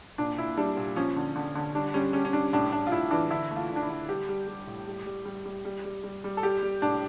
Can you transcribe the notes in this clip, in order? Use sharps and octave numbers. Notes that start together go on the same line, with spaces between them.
A#2 D4
A#2 E4
G3 D4
A#2
F3 C#4
D3
D3
D3
G3 D4
G3 C#4
G3 C#4
C#4
G3 D4
A2 D4
A2 D4
F4
A2 E4
E3 D4
D3 E4
A3
F4
D3
D4
E4
D3
G3 G4
G3
G3
A2
G3
G3
G3
G3
G3
G3
G3
G3
A4
G3 G4
G3
A2 D4